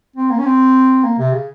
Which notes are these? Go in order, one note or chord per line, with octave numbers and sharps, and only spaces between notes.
C4
A#3
C#4
C4
A#3
C3
C#3